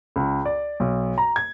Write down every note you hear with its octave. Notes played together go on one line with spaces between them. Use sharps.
C#2
D5
B1
A#5
G#6